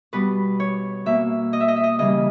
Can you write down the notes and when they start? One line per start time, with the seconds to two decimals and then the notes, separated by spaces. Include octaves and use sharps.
0.13 B2 G3 B3 B4
0.60 C#5
1.06 B2 A#3 E5
1.53 D#5
1.60 E5
1.68 D#5
1.76 E5
1.84 D#5
1.99 C#3 E3 G3 A#3 D#5